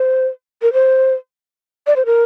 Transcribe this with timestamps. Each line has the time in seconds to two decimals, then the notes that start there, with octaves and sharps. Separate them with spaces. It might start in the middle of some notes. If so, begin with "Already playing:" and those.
Already playing: C5
0.62 A#4
0.73 C5
1.87 D5
1.96 C5
2.06 A#4